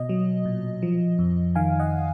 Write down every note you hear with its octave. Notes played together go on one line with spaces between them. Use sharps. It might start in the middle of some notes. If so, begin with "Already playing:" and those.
Already playing: B2 D#5
F#3
A#2
F3
F2
D#3 F5 G#5
D#5 F#5